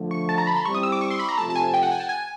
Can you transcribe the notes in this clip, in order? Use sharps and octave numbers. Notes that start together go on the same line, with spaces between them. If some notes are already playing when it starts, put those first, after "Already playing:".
Already playing: D3 F3 A3
C#6
A5
A#5
B5
C6
G3 C4 E4 C#6
D#6
E6
D6
C#6
C6
B5
A#5
C3 F3 A3 A5
A5
G#5
G5
F#5
G#5
A5
G#5